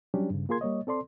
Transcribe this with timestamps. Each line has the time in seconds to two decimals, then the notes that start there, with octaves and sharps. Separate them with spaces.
0.14 F#3 G3 C#4 D4 G4
0.31 G2 C#3
0.49 A#3 F4 G#4 A#4 C6 G#6
0.61 G3 A#3 C#5 D#5
0.87 C4 A4 D5 C6